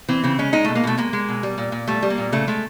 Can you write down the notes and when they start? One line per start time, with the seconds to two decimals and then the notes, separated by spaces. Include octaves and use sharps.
0.09 E3 C4
0.23 C#3 C4
0.38 G#3 C#4
0.53 G#3 D#4
0.64 B2 A3
0.76 A#3
0.84 B2 A3
0.98 G#3 A#3
1.13 G#3
1.29 B2
1.43 G3
1.58 A#2
1.72 A#2
1.87 G3 A3
2.03 G3
2.10 A#3
2.18 A#2
2.32 C#3 A3
2.47 G#3 A3